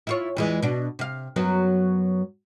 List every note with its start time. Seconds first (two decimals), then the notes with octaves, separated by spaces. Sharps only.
0.07 E4 F4 C#5
0.36 E2 E3 G#3
0.62 B2 D4
0.99 C3 F5
1.36 F#2 F#3 B3